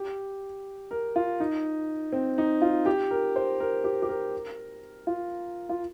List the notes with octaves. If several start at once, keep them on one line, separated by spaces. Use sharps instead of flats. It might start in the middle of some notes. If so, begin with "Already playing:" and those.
Already playing: G4
A#4
F4
D#4
C4
D#4
F4
G4
A#4
C5
A#4
G4
G4
A#4
F4
F4